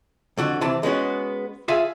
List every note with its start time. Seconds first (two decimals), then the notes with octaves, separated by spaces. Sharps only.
0.38 F2 D3 F#4
0.61 C3 E3 A5
0.83 G#3 B3 C#4 F#4
1.68 F4 G#4 E5 F5 G#5